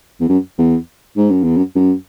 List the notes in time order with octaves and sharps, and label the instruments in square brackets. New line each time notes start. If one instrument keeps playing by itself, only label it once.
[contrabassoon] E2
F#2
E2
G#2
F#2
E2
F#2
F#2